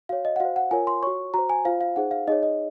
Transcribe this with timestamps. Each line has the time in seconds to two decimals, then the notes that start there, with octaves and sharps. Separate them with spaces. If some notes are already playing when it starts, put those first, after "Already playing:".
0.09 F#4 C#5 F5
0.25 D#5
0.36 F#5
0.40 F#4 C5 F5
0.56 F#5
0.71 F4 A#4 C#5 G#5
0.87 C6
1.03 F#4 C#5 C#6
1.34 F#4 C5 A#5
1.50 G#5
1.65 F4 C5 F5
1.81 F5
1.96 D#4 G#4 C5 F#5
2.11 F5
2.27 D#4 G#4 C#5 D#5
2.43 D#5